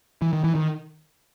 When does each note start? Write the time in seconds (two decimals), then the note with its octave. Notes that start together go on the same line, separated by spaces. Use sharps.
0.22 E3
0.33 D#3
0.44 E3
0.55 D#3